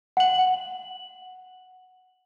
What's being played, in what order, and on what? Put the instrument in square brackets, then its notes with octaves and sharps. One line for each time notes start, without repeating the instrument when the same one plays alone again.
[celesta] F#5 F#7